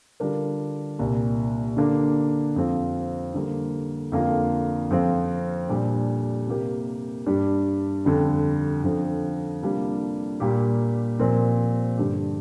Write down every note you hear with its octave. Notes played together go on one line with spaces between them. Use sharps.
D3 G3 D4 F4 A#4
C2 A#2 A#3
D3 A#3 D4
F2 F3 C4 F4
D3 G3 A#3
F2 D3 A#3 D4 F4
F2 F3 C4 F4
A#2 G3 D4 G4
C3 A#3 G4 A#4
G2 G3 D4
F2 D3 G3
F2 D3 F3
C3 G3 A#3 D4 F4
A#2 G3 A#3 G4
A#2 F3 C4 A#4
G2 D3 G3 D4 G4